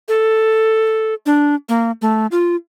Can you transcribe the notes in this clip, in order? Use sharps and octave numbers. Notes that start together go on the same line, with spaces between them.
A4
D4
A#3
A3
F4